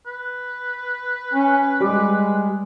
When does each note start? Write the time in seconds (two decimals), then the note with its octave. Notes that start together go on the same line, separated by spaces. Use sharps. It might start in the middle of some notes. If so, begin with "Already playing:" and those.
0.06 B4
1.33 C#4
1.80 G3 G#3 D6